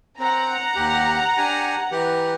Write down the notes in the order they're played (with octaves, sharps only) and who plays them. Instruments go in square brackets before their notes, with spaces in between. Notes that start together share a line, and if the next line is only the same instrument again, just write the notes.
[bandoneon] C4 [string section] F#5 A#5
[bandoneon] D#2 G4
D4 G4 G#5
E3 G4